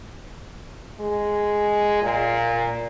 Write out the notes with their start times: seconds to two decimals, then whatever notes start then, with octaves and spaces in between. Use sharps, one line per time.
1.00 G#3
2.02 A#2